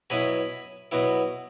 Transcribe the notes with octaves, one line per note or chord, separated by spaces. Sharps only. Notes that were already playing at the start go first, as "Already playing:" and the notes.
B2 F#3 B3 E4 G#5 B5
B2 F#3 B3 E4